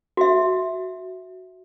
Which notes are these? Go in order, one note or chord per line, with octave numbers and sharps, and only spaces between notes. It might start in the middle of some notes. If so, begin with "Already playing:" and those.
F#4 E5